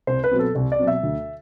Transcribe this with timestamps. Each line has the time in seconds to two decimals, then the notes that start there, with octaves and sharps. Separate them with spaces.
0.07 C2 C5
0.24 B4
0.31 B2 F#3 C4
0.39 A4
0.55 C2
0.72 D5
0.79 B2 F#3 C4
0.87 E5
1.03 D2